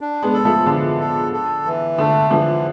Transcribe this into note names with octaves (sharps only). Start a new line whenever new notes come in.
D4
G#3 B3
A4
F3 A3
D3 E3 F3
A4
A4
E3
D3 A3
D3 E3 F3